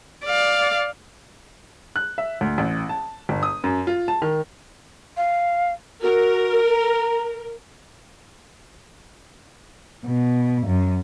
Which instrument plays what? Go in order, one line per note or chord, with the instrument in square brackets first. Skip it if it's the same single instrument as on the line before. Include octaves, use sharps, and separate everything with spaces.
[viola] D5 F5
[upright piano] F#6
E5
D2
A1
A5
G1
D#6
F#2
F4
A5
D#3
[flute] F5
[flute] F#4 [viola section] A#4
[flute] A#5
[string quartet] B2
F#2